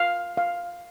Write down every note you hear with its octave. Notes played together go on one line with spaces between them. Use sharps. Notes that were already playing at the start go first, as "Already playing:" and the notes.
Already playing: F5
F5